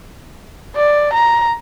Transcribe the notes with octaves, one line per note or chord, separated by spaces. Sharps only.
D5
A#5